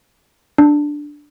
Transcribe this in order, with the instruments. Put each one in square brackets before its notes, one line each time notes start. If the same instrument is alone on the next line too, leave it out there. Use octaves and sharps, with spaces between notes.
[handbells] D4